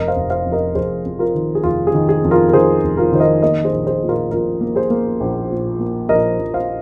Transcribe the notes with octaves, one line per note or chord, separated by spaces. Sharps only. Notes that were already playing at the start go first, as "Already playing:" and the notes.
Already playing: F1 A#4 D#5
C5 F5
F1
C5 F5
F2
A#4 D#5
F1 G#4 C5
F2
F4 A#4
D#3
G#4
F1 F4
G#4
D#3
G#4
F2
F4 A#4
A#4
D#3 G#4 C5
F1
F4 A#4
D#3 C5
A#4 D#5
A#3 A#4 D#5
G#4 C5
A#1
G#4 C5
A#2
F4 A#4
A#1 F4 A#4
A#3
G#4 C5
A#3
A#1
A#2
A#3
A#1 A#4 D#5
A#1
C5 F5